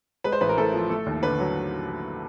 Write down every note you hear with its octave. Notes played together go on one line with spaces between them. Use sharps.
G#3 B4
C5
A1 B4
A#4
A2 A4
F3
A3
D#2
D3 B4
F#3